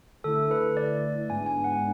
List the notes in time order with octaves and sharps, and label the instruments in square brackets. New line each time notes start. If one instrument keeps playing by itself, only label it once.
[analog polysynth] D3 A3 E4 [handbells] A4
[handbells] B4
D5
[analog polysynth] G#2 G#3 B3 D4 [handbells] G#5
[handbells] G#5
F#5